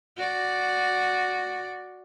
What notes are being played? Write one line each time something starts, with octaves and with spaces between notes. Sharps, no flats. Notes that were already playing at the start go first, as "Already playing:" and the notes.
F#4 D5